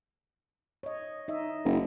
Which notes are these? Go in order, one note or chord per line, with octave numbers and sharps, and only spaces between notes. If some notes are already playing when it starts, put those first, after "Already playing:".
C#5 D#5
D#4 D#5 E5
F#1